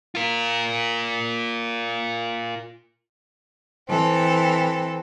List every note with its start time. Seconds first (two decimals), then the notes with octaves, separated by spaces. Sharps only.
0.15 F4 A#4
3.88 E3 C4 A4